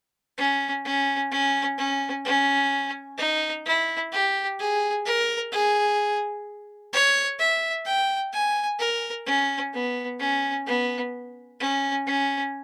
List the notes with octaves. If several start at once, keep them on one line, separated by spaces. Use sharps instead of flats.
C#4
C#4
C#4
C#4
C#4
D#4
E4
G4
G#4
A#4
G#4
C#5
E5
G5
G#5
A#4
C#4
B3
C#4
B3
C#4
C#4